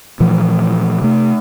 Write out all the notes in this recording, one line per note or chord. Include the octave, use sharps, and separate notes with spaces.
A#2 E3 F3 A3
C3 A3